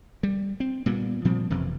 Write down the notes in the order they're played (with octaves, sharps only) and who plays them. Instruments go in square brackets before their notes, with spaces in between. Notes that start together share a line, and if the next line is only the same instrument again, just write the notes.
[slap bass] G3
C4
A#2 G3 A#3 B3
A#2 F3 G3 C4
F#1 F2 C3 E3